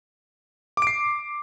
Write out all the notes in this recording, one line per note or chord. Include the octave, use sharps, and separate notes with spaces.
D6 C7 D7